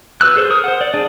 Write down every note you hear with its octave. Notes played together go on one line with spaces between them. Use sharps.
F#4 B4 E6 F#6
G#4 A4 C5
A#4 D#6
C5 F#5
D5
D4 G#4 D5